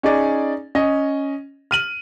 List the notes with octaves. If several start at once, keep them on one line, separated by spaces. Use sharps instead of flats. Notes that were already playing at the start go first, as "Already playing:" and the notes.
C#4 D#4 G#4 D5
C#4 D#5
F6 D#7 F#7